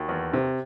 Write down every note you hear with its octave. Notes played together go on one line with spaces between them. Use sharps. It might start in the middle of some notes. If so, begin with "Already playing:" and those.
Already playing: D#2 F#4
E2
C3